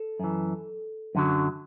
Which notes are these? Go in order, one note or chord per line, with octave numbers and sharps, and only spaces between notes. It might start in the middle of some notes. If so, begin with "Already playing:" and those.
Already playing: A4
F#2 E3
F#2 D3 F#3